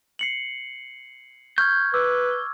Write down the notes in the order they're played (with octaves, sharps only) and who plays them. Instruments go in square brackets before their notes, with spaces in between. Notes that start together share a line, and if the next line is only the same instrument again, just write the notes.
[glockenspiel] C7 C#7 F#7
[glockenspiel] C#6 F6 G#6 [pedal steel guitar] G6
[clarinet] B4 [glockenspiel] D6 E6